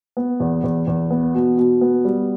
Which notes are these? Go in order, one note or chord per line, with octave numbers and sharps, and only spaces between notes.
B3
E2
E2
E2
B3
B2
B2
B3
G3